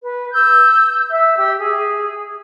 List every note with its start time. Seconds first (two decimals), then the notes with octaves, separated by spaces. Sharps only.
0.02 B4
0.33 E6 G6
1.11 E5
1.36 G4 E6
1.59 G#4